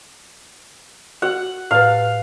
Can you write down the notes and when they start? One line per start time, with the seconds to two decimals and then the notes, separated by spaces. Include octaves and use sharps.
1.22 F#4 F#5
1.71 A2 B4 F5